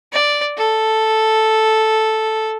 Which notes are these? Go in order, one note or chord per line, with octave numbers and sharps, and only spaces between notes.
D5
A4